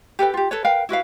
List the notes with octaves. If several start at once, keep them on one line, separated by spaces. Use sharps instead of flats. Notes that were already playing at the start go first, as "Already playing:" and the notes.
G4 A4 B4 G5
F4 G4
A4 B4 C#5
A#4 B4 F5 G5
E4 F#4 B4 F5